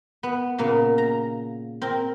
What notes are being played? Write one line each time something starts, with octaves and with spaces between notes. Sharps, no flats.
B3
A#2 C#3 A#3 B3
A#5
C4 A#4